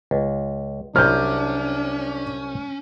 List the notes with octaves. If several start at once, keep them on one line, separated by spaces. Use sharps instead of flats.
C#2
C2 F#3 C#4 D4 F6 G6